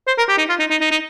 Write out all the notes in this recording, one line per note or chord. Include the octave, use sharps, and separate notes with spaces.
C5
A#4
G4
D#4
F4
D#4
D#4
D#4
D#4